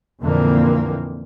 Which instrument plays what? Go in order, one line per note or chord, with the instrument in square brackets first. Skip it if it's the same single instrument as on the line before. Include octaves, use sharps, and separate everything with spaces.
[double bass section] F2 A#2 D3 E3 A#3 C4